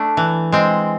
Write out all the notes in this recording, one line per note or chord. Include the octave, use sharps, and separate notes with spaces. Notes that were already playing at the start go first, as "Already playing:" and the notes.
Already playing: A3 D4
E3
G#3 C4